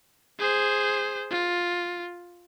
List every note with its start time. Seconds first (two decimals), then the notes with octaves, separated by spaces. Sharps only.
0.39 G#4 C5
1.31 F4